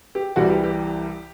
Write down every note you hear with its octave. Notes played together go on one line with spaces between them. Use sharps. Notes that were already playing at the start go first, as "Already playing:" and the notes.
G4
C2 C3 E3 G3 F#4
G4
G4